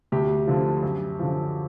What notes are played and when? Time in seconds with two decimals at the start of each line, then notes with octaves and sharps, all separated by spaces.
0.12 D2 G4
0.47 D3 F3
0.83 F#2
1.20 D3 F3